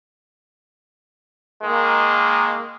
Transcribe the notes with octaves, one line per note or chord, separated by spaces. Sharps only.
D#3 G#3 A#3